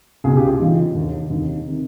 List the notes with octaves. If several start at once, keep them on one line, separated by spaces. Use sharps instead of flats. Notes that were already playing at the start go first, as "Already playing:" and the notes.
C#2 B2 G#4
G4
F4
E1 E2 C#3 E3 D#4
D#2 D3
F1 D#2 D3 D#4
C3 D#3